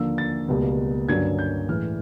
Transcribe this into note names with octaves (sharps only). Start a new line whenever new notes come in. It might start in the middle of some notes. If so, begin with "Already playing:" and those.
Already playing: D#2 D3 F3 A#3 E6
A6
C#2 B2 G3 A#3
G2 D3 F#3 A#3 C#4 G#6
G6
A2 E3 G#3 F6